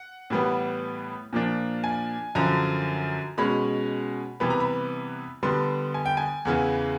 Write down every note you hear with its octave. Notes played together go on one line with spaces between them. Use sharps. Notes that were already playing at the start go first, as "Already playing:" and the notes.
Already playing: F#5
A2 E3 G3 B3
A#2 F3 A#3 D4
G#5
F#2 D3 F3 A#5
B2 G#3 C#4 B5
C3 E3 G3 B3 B5
A#5
B5
D3 G3 B3 C6
G#5
G5
G#5
E2 C#3 E3